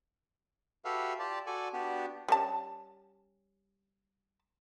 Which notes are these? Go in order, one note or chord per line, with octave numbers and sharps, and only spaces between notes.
F#4 G4 A4 B4 E5 F5
F4 G4 D5 A5
F#4 A4 D5 G#5
B3 D4 F#4 G4
G3 C#4 A5